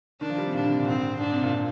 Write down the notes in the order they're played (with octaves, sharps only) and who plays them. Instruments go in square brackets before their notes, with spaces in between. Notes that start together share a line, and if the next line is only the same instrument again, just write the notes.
[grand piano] D#3 [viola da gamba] D4
[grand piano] F3
G3
C3
[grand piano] A#2 [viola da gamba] D4
[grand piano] D3
C3
A#2
[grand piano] G#2 [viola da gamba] C4
[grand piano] G#2 [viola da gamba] D4
[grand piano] C3
A#2
A#2